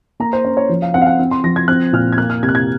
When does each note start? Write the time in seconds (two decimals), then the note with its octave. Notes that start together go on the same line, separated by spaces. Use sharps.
0.20 A#3 A#5
0.33 C5
0.45 C#4 C#5
0.57 C#5
0.69 F3
0.82 F5
0.94 C4 F#5
1.02 F5
1.07 F#5
1.19 C4
1.31 C6
1.44 F3 A#6
1.56 G#6
1.68 C4 F#6
1.93 A#2 F6
2.12 G#6
2.17 A#3 F#6
2.30 F6
2.43 C3 G#6
2.49 F#6
2.55 G#6